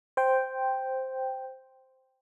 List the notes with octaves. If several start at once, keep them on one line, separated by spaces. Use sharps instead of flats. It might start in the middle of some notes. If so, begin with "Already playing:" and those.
C5 G5